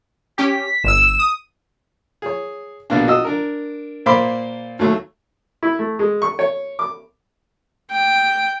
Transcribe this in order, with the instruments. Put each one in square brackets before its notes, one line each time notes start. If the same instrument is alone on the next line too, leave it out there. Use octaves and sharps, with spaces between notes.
[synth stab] C#4 G4 [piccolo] B6
[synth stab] G1 E6 [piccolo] E7
[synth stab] D#6
[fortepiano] G#4 C#5
A#1 B2 A#3 D4
F#4 D#5 E6
D4 A#4
A#2 A#3 C5 B5 C6 D6
D#2 F#3 A3 C#6
E4
A3
G#3
C#6
C#5
D6
[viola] G5